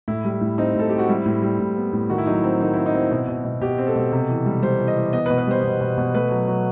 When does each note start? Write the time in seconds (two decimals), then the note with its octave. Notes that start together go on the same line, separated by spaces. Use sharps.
0.08 A2 E4
0.25 G3
0.41 A2
0.58 C4 D#4
0.75 A2 A4
0.90 C4 G4
0.99 F#4
1.09 G3 E4
1.26 A2
1.42 G3
1.60 A2
1.77 B3
1.93 A2
2.10 D#3 F#4
2.18 E4
2.26 F#3 D#4
2.34 E4
2.44 C4
2.60 D#3 D#4
2.73 C4 E4
2.86 D#4
2.94 C4 E4
3.11 B2
3.28 B2
3.45 B2
3.61 B2 G4
3.78 C4
3.87 A4
3.96 B2
4.12 C3
4.29 E3
4.46 G3
4.62 G3 C5
4.79 E3
4.88 D#5
4.96 E3
5.13 B3 D#5
5.26 B4
5.30 B2
5.38 B4
5.47 G3 C5
5.64 B2
5.81 B2
5.97 B2
6.14 A3 B4
6.31 F#3
6.48 F#3